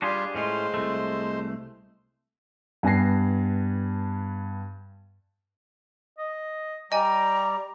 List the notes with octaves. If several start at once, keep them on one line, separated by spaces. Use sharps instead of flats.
G3 D4 F4 G4 G#4
A2 G#3 C#4 F4 C5
C2 A3
G2 B3 G#5 A5 A#6 C7
D#5
G3 D5 D#5 G5 G#5 A#5